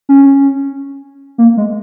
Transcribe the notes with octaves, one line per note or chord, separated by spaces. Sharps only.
C#4
A#3
G#3